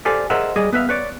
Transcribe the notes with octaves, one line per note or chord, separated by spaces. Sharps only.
G4 A4 C5 D5 F5 G#5
G#4 A#4 C5 D#5 E5 F#5
G3 G#4 D5 D#5
B3 B4 E5 F5
B4 C#5 D5